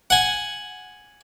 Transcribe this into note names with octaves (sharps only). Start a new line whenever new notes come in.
F#5 G#5